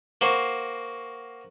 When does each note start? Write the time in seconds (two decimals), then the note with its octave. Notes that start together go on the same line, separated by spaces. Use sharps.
0.21 A#3 F#4 C5